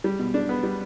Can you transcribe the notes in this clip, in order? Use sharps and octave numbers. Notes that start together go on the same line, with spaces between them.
G3
B2
D4
B3
G3